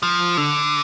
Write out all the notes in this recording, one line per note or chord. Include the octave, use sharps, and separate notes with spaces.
F3
D3